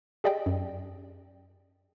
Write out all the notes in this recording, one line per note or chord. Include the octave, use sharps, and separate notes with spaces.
G4 G#4 D5 D#5 G5
F#2